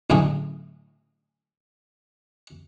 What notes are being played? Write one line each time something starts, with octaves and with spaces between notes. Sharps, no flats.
A1 D2 A2 C#3 F#3 G#4